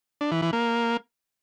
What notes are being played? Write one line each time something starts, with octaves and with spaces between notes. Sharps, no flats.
D4
E3
E3
A#3